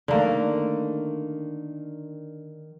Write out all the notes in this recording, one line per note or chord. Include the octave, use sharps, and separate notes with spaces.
D3 D#3 A3 A#3